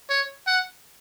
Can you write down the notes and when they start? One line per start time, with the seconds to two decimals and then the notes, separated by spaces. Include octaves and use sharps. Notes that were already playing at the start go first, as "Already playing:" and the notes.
0.10 C#5
0.47 F#5